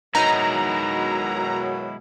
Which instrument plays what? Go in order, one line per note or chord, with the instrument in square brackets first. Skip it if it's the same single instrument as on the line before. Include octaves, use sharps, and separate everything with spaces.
[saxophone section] B2 D#3 F#3 [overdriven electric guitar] G#3 E4 [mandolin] D#4 [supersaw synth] A#5